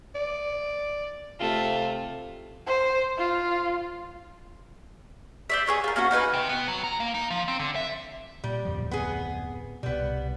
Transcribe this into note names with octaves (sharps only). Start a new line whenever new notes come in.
D5
C3 A3 F4
C5
F4
C5 D5 E5
G#4 B4 C#5 D5
F4 A#4
A#3 C#4 F#4 F#5
A#3 D#4 B4 G#5
C3
B3
F#3
A#5
A#3
D#4
F3
C4
D3
E5
A#2 G3
D1 F2 F3
B3 G#4
C2 B2 G3 B3